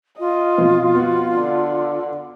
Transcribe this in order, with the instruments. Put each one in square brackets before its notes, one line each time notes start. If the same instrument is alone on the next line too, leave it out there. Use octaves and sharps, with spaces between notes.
[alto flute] F4 [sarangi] D#5
[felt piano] B2 F3 C4
[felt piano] B3 [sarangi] F#4
[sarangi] D3